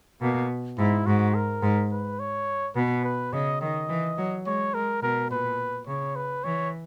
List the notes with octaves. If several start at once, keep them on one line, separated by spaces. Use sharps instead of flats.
B2 A#3
G#2 E4
G#2 F#4
A#4
G#2
B4
C#5
B2 B4
B4
C#3 D#5
D#3 D#5
E3
F#3
G#3 C#5
G#3 A#4
B2 A#4
A#2 B4
C#3 C#5
B4
E3 C#5